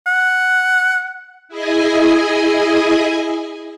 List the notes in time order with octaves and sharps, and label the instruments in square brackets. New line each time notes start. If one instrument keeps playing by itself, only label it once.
[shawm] F#5
[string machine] E4 G#4 D#5 G#5